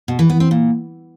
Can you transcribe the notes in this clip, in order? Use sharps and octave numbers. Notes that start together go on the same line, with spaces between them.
B2
E3
B3
C4
A#2